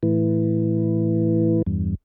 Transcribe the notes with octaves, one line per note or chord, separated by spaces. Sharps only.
A2 E3
E2 G2